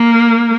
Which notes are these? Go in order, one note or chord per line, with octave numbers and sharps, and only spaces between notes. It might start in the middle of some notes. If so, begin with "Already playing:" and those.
Already playing: A#3